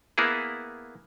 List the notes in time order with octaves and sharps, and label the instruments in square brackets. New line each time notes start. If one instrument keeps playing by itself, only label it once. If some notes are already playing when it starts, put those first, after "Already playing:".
[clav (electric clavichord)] A#3 B3 E4 G#4